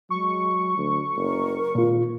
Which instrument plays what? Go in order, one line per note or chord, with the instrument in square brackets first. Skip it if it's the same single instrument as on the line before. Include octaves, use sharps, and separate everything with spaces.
[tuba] F#3 [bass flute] G#3 [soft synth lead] C#6
[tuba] D2
[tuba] F#1 [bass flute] A#4
[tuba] G#1 [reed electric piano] A#2 F4